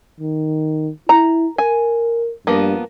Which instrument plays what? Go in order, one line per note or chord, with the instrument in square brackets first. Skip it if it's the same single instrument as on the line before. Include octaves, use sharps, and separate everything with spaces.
[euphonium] D#3
[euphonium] E4 [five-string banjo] A#5
[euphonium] A#4 [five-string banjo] G#5
[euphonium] G2 [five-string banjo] F3 A#3 B3